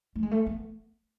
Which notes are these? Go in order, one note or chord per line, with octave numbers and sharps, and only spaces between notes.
A3
G#3
A3
B3